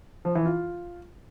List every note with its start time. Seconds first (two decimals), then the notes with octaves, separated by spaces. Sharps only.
0.25 F3
0.35 E3
0.46 F4